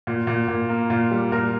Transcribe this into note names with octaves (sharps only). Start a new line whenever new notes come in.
A#2
A#2
A#2
A#3
A#2 F4
G3
A#2 A#4